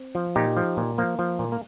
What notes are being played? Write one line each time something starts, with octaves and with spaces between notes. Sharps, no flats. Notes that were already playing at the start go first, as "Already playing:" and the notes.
Already playing: C4
F3
A#2 D#4 G4
F3
A#2
F3 A#3
F3
A#2
A#3